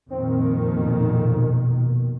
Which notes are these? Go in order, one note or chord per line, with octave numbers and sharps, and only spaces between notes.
F2 A#2 D#3 C4
B2